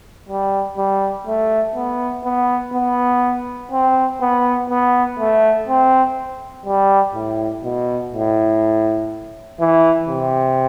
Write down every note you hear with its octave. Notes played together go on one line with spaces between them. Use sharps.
G3
G3
A3
B3
B3
B3
C4
B3
B3
A3
C4
G3
A2
B2
A2
E3
C3